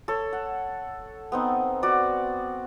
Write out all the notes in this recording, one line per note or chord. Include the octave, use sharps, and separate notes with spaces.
A4 C#5
F#5
B3 C4 D#4
F#4 D5